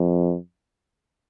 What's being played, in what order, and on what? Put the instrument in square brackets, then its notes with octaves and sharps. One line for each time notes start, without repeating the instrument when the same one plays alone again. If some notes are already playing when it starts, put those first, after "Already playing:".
Already playing: [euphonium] F2